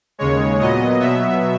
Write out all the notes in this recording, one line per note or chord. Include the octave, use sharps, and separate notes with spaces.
D#2 C#3 G#3 C#5
A#2 F#3 B3 D#5
B2 F#3 B3 E5